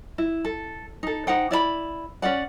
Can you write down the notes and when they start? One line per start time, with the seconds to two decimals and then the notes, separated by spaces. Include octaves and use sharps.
0.18 E4
0.45 A4
1.03 D#4 A4
1.27 D#4 C5 F#5 G5
1.51 E4 D5 E5 B5
2.22 C#4 F4 D5 F#5